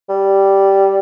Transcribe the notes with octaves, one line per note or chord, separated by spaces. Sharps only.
G3